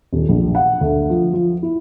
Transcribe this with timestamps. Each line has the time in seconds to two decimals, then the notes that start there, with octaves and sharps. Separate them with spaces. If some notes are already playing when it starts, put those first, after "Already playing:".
0.13 D#1
0.29 A#1
0.55 F#5
0.81 D2
1.10 F3
1.33 F3
1.62 E4